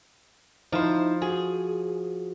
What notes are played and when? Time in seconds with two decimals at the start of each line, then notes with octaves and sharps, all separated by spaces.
0.72 F3 D#4 E4 C5
1.22 F#4 G#4